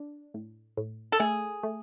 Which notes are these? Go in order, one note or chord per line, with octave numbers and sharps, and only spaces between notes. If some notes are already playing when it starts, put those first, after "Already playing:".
Already playing: D4
A2
A2
A4
A3 G#4
A3